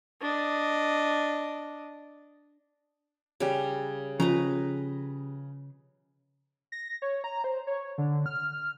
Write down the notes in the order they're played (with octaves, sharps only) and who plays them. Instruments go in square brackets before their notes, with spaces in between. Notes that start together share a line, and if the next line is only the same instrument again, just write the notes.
[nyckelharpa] D4 D#5
[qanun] C#3 G3
[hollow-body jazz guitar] C#3 [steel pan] F3 [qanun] B4 D#5 A#5
[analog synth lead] A#6
C#5
A#5
C5
C#5
D3
F6